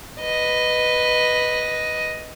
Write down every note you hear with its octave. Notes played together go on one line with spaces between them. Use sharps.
B4 D#5